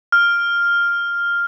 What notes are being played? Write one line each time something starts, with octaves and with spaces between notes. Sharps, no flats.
F6